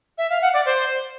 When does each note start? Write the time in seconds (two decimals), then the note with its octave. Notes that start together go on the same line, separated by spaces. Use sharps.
0.18 E5
0.30 F5
0.42 F#5
0.53 D5
0.65 C5